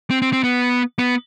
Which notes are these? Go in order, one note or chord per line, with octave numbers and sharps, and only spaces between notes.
C4
C4
C4
B3
B3